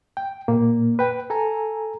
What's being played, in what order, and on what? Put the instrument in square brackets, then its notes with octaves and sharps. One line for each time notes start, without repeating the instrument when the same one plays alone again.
[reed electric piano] G5
A#2 A#3
B4 G5
A4 G#5 A#5